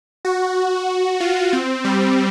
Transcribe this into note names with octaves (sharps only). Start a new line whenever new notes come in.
F#4
F4
C4
G3